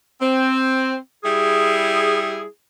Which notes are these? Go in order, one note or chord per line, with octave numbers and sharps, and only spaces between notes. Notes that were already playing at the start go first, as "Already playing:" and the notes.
C4
G3 E4 G#4